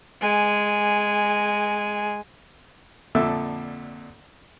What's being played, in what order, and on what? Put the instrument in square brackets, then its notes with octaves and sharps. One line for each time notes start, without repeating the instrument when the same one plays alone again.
[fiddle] G#3 G#5
[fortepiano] F2 A#2 D3 A4 E5 E6